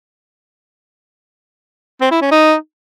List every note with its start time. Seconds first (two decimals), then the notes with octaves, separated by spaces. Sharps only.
2.01 C4
2.11 E4
2.21 C#4
2.32 D#4